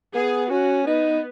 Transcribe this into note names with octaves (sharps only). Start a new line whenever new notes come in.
B3 G#4
C#4 F#4
B3 D#4